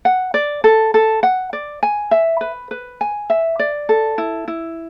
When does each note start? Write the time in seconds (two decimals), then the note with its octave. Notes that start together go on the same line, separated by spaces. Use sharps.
0.05 F#5
0.34 D5
0.64 A4
0.94 A4
1.23 F#5
1.53 D5
1.83 G#5
2.11 E5
2.41 B4
2.71 B4
3.01 G#5
3.30 E5
3.59 D5
3.89 A4
4.18 E4
4.48 E4